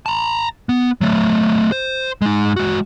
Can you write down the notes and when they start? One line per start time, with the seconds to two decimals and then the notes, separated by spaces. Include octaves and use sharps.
0.06 A5 A#5
0.69 B3
1.01 F#3 A3
1.72 C5
2.22 G#3 D#4
2.57 G#3 F#4